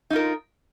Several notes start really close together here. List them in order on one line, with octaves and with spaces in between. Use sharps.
D#4 F4 A#4